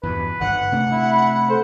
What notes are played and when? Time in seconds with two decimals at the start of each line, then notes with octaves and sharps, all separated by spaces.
0.03 E2 G2 B2 B4
0.40 G1 G#2 D3 F#5
0.72 C3 A3 D4
0.91 E4
1.10 B5
1.49 A4 C5